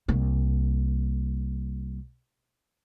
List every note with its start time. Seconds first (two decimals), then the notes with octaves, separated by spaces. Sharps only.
0.08 C2 A#3